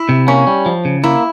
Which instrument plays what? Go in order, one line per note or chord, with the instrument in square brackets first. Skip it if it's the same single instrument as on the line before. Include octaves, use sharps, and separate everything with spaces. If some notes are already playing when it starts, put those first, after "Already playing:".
Already playing: [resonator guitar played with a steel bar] E4
[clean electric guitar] C3
[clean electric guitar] A#3 [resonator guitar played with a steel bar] C#4
[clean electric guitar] G3
F3
C#3
[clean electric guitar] A#3 [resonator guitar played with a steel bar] E4